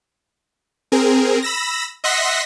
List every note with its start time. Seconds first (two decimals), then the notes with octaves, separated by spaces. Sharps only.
0.92 C4 G#4 A#4
1.42 B5 E6 A#6
2.04 D#5 E5 F#5 C6 A#6 B6